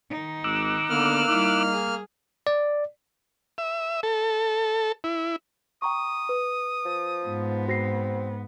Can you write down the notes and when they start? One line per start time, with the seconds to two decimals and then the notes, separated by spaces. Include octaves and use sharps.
0.10 D#3 D#4
0.44 G#1 D6 E6 F#6
0.90 D3 A#3 B3 F6
1.29 G3 D#4 E4
1.71 G#4
2.47 D5
3.58 E5
4.03 A4
5.04 E4
5.82 G5 A#5 C#6 D#6
6.29 B4
6.85 F3
7.26 G#2 B3
7.68 C4 F#4 A#6 C7